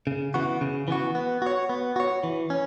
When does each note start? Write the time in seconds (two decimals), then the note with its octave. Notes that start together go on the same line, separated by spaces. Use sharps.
0.07 C#3
0.34 E3 B3 F#4
0.61 C#3
0.88 E3 B3 F#4
1.15 B3
1.42 F#4 C#5
1.69 B3
1.96 F#4 C#5
2.23 E3
2.50 C#4